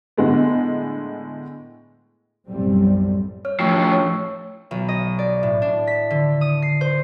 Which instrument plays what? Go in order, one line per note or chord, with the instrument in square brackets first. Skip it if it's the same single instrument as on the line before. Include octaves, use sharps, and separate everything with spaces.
[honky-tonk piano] A2 D3 G#3 B3
[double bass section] B1 F#2 A2 G3 C4
[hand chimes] C#5 F6
[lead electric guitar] A2 F3 [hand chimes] G5 C#6 E6
[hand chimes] C#5
[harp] B1
D#5
D5
A2
D4
B6
D3
D#6
C7
C5